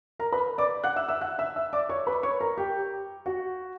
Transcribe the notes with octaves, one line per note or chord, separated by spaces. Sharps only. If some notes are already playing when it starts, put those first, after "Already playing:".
A#4 A#5
B4 B5
D5 D6
F#5 F#6
E5 E6
E5 E6
F#5 F#6
E5 E6
E5 E6
D5 D6
C#5 C#6
B4 B5
C#5 C#6
A#4 A#5
G4 G5
F#4 F#5